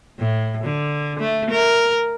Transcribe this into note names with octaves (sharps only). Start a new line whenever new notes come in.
A2
D3
A3
A#4